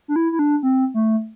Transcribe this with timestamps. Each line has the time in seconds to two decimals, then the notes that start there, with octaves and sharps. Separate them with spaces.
0.08 D4
0.16 E4
0.32 E4
0.39 D4
0.63 C4
0.94 A3